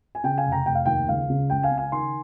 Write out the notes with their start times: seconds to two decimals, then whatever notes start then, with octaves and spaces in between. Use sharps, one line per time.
0.15 G#5
0.24 C#3 G5
0.38 F5 G#5
0.45 F1
0.52 G5 A#5
0.66 F1 G5
0.75 F5
0.86 D#2 G5
1.07 C#2 F5
1.30 C#3
1.50 C#2 G5
1.63 F5 G#5
1.71 C#3
1.78 F5 G#5
1.92 D#3 G#5 C6